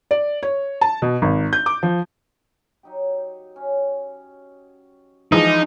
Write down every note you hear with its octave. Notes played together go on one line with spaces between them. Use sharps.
D5
C#5
A5
B2
G#1
G6
D6
F3
F#3 D#4 G4
C#4
E3 F3 G#3 D#4 E4 G#4 A#4